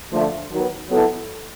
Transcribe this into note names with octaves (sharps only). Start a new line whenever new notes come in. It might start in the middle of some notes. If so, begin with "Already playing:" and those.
D3 F3 A3
D#3 F#3 B3
F#3 B3 E4 A4